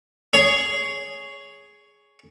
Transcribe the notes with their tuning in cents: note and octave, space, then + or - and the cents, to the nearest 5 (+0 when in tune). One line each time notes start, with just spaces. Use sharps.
G#4 +0 C#5 +10